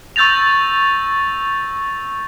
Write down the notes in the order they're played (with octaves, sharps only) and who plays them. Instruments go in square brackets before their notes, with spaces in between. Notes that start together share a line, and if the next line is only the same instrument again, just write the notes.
[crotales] C#6 E6 G6 A6 A#6 F7